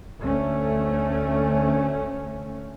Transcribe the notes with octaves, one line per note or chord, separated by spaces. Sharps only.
D2 A3 C#4